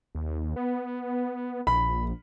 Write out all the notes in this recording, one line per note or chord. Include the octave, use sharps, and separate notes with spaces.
D#2
B3
A#1 B5